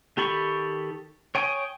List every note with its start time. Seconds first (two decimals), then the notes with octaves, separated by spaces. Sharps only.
0.17 D#3 G4 A4 B5 C#6
1.35 C#5 G5 G#5 D#6